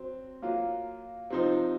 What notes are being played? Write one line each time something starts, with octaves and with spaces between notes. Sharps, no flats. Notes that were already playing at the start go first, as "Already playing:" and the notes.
Already playing: F#3 C4
F#3 A#3 F4
C3 F3 C4 D#4